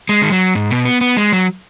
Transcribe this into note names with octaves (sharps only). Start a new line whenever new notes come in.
G#3
D#3
F#3
G#2
B2
B3
B3
G#3
F#3